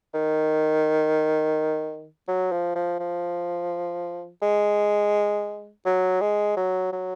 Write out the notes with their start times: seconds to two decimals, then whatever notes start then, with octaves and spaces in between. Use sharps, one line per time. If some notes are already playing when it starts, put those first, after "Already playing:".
0.14 D#3
2.28 F#3
2.52 F3
2.75 F3
2.99 F3
4.42 G#3
5.85 F#3
6.21 G#3
6.56 F#3
6.92 F#3